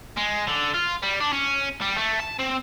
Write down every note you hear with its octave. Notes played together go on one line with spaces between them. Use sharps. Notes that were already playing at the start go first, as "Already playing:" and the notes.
G#3
D3
F4
G3
D4
C#4
G3
A3
A5
C4